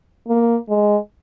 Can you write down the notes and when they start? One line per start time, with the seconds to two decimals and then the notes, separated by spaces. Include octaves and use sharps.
0.28 A#3
0.69 G#3